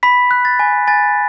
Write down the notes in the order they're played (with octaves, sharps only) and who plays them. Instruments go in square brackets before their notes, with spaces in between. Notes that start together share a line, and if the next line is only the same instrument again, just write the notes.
[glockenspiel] B5 B6
F#6
A6
G#5
G#5 A6